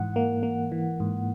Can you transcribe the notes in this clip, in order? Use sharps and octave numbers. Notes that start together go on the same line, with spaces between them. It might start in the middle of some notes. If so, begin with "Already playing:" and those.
Already playing: G#2 E3 F#5
A#3
A#3
E3
G#2